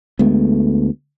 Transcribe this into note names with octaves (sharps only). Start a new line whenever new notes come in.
D2 G#3 A3 B3